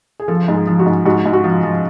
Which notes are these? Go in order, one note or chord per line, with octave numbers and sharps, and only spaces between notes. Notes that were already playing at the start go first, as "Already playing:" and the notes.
G#4
F3 A4
G#2
G#4
F3
F#4
G#2
G#2 F#4
G#2
F#4
F3 F4
F3